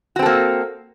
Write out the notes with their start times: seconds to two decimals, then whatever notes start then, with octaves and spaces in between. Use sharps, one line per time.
0.16 F#4
0.19 C4
0.22 A4
0.26 A#3